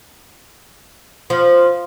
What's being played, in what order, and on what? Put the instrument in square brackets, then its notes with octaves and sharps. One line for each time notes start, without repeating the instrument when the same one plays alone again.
[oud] F3